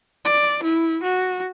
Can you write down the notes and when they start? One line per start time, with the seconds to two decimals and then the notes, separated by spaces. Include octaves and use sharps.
0.25 D5
0.64 E4
1.03 F#4